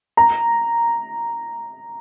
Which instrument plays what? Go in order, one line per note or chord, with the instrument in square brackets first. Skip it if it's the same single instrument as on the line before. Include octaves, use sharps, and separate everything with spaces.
[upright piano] A#5